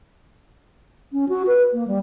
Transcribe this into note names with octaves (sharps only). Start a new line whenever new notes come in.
C#4
F#4
B4
A#3
G3